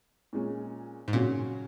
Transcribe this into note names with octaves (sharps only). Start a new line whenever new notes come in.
A#2 G#3 C#4
G#2
A#2 C#3 F#3 C#4 F#4